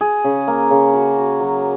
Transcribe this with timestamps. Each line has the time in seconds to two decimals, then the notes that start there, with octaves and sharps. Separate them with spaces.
0.01 G#4
0.25 C#3
0.48 A#3
0.71 C#3
0.94 F#4
1.17 F#4
1.40 F#3